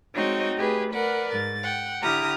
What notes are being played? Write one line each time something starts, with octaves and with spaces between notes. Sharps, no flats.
G#3 C4 D#4 F#4 C#5 D#5
A3 G4 G#4 B4
A#4 B4 D5 F#5
G#2 A6
F#5 G5
D3 E4 G4 A#5 D#6 F6